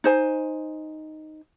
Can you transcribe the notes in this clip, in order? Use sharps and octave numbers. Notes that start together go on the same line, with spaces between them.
D#4 C5 G#5